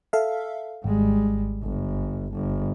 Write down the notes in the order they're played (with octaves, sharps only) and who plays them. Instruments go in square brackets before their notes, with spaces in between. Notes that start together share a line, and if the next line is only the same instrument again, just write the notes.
[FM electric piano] A4 E5 F5
[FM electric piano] G#1 [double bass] G3 G#3
[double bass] G1
G1